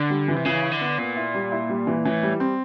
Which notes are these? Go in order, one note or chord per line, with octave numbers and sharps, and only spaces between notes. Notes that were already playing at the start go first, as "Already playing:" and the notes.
Already playing: D3
G3
E3
C3
C#3 E3
E4
D3
B3
A#2 B3
E4
G3
E4
G3
E3
A2 E3
G3
C4